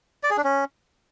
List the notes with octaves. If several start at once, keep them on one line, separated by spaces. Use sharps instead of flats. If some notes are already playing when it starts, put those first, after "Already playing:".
D5
G#4
D4
C#4